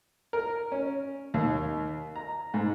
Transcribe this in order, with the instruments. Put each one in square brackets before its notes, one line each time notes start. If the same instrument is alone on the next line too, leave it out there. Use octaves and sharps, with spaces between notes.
[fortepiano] A#4
C#4
D#2
A#5
G#2